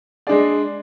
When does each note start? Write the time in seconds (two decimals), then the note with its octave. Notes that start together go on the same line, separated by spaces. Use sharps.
0.27 G#3 D4 G#4 D5